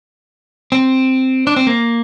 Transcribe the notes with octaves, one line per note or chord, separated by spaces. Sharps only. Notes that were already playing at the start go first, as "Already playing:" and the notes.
C4
D4
C4
A#3